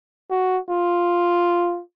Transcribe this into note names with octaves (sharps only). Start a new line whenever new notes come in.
F#4
F4